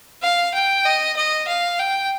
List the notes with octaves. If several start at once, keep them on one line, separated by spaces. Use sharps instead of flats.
F5
G5
D#5
D#5
F5
G5